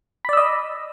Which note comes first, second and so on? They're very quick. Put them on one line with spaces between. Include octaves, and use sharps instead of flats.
B5 D5 E6 D#5